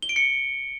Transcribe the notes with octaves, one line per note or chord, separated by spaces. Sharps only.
G7
D7
C#7